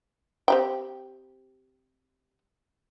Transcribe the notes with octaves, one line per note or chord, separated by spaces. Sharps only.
C4 G4 G5